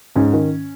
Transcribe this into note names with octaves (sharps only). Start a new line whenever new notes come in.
G#2 C#4
D#3